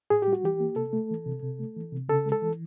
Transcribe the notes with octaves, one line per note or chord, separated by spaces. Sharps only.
A2 G#4
G4
G3
F#4
E3 G4
A#3
C3 A4
A3
E3
C3
C3
A3
E3
C3
C#3 A4
G#3
A4
E3